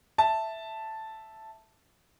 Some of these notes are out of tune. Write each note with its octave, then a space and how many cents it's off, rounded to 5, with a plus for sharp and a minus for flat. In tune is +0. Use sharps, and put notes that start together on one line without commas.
E5 +0 A5 +0